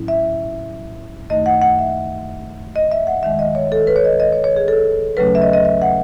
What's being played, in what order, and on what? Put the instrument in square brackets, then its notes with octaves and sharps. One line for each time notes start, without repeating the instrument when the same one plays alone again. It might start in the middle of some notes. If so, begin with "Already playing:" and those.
Already playing: [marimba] A2 F#3 C#4 E4
E5
F#2 D#3 A3 D#4 D#5
F#5
F#5
E5
D#5
E5
F#5
D#2 D#3 G#3 E5
D#5
C#5
A4
B4
C#5
D#5
D#5
C#5
C#5
G#4
A4
D#2 C#3 F#3 A3 C#4 B4
E5
D#5
D#5
E5
F#5